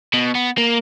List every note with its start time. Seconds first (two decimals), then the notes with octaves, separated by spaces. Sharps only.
0.14 B2
0.35 B3
0.58 A#3